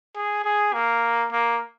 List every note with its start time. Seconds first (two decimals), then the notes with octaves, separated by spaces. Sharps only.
0.16 G#4
0.45 G#4
0.74 A#3
1.32 A#3